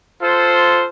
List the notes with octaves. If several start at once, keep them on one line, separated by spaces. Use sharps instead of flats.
F4 A4 C5